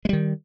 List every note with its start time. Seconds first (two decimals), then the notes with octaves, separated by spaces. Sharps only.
0.05 G#3
0.09 G3
0.13 D#3